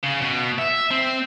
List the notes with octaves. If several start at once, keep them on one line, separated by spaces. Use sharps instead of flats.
C#3
B2
E5
C4